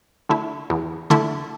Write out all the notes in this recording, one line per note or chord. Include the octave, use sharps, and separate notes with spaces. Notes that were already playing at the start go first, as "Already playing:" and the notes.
D3 A3 E4
E2
D3 A3 E4